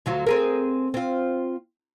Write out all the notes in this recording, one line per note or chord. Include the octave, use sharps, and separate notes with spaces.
D2 F#3 F4
C4 G#4 A#4
C4 F4